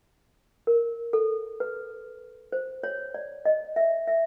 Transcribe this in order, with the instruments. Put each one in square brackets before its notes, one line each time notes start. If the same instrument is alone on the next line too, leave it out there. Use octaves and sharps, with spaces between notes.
[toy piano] A#4
A4
B4
C5
C#5
D5
D#5
E5
E5